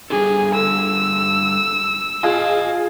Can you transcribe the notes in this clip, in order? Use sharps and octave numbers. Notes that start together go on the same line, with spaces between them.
G3 D4 G#4 A4
D3 E6
F4 G#4 D#5 A5